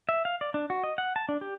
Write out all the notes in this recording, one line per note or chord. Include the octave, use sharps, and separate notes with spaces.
E5
F5
D5
D4
F#4
D#5
F#5
A5
D4
G4